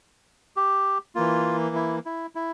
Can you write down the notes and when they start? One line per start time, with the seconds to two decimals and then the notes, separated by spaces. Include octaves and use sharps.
0.56 G4
1.15 E3 A#3 F4
1.75 E4
2.06 E4
2.35 E4